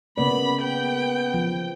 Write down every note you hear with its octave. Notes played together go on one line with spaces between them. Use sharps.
C#3 A#3 B3 D5 B5
B3 G5
F3